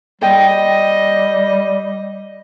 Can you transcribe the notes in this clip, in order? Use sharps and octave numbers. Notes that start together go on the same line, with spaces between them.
G3 C5 D#5 G5